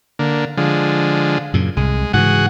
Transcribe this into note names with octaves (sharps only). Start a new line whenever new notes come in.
D3 A#3
D3 F3 G#3
F#2 A#2 C#3
C2 G#3
G#2 C#3 E3 F#4 G#4 F#5